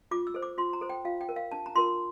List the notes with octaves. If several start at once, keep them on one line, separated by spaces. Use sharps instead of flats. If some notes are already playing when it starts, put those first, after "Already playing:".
F4 D6
E6
A4 C5
D6
F4 C6
A#5
A4 C5
G5
F4 F5
G5
A#4
F5
D4 A5
A#5
F4 A#4 C6